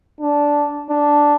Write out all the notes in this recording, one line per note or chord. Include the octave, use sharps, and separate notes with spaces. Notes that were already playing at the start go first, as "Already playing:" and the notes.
D4
D4